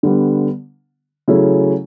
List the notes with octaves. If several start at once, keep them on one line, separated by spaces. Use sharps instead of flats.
D3 G3 B3
C#3 F#3 A3 C#4 E4